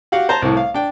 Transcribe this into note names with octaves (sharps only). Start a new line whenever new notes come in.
F#4 G4 F5 F#5
C5 A5 A#5
C2 A2
F5
D4 G5